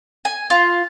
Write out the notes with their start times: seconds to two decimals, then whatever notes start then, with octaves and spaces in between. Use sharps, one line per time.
0.25 G#5
0.50 F4